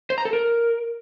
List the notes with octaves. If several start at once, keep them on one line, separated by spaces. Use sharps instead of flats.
C5
A#5
A4
A#4